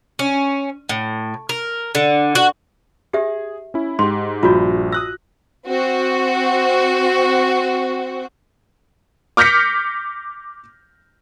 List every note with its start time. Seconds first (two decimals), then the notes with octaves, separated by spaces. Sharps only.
0.19 C#4
0.89 A2
1.49 A#4
1.95 D3
2.35 F#4
3.13 G4 G#4 E5
3.74 C#4 E4
3.99 G#2 G4 C6
4.43 A#1 G2 F4 F#4 G6
4.92 D#6 E6 F#6 A#6
5.67 C4 F#4
9.37 D6 F6 G6 A#6 B6 C#7